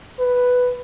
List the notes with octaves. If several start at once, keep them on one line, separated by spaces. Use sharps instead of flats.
B4